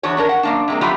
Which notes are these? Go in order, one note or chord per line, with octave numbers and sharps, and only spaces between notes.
E2 D4 F#4 C#5
C#4 D4 A#4
F#5
F#2 A#3 D4
C3 G#3 A#3
F#3 A3 B3 F4 G4